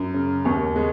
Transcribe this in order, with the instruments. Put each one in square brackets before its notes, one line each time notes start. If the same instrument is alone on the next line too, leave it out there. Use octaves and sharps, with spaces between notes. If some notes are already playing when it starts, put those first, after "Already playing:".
Already playing: [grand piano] F#2
C#3
D#2
G#3